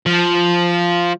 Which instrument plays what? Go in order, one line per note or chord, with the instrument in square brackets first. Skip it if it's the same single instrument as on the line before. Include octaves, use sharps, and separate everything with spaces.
[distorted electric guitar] F3